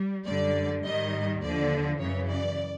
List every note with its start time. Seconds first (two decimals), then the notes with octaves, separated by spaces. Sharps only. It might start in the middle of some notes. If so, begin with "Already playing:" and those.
Already playing: G3
0.26 F#2 D3 G3 D5
0.84 G#2 D#3 G3 D#5
1.41 D#2 D3 F3 D5
1.99 F#2 C#3 E3 C#5
2.28 D5